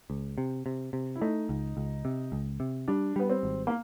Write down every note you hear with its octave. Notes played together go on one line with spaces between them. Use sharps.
C#2
C3
C3
C3
E4
A3 D#4
C#2
C#2
C3
C#2
C3
G3 D4
G3 B3
C4
G#1
A#3